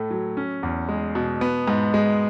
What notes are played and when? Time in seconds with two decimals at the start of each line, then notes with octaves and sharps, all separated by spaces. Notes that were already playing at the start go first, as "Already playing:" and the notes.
Already playing: A2 A3
0.11 F#3
0.37 C#4
0.63 E2
0.89 G#3
1.15 B2
1.41 B3
1.68 G#2
1.94 G#3